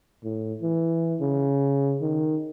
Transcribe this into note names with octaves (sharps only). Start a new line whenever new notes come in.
A2
E3
C#3
D#3